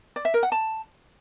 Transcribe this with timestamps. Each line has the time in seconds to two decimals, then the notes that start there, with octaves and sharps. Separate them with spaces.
0.16 D5
0.25 E5
0.34 A#4
0.43 F#5
0.52 A5